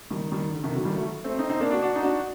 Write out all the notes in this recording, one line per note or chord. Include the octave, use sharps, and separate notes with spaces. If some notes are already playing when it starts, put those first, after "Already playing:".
D#3 G3
D#3 G3
D3
C3 D#3
D3 F#3
D#3 G3
F#3 A3
A3 C4
C4 D#4
C4 D#4
A#3 D4
D4 F#4
D4 F#4
D#4
D4 F#4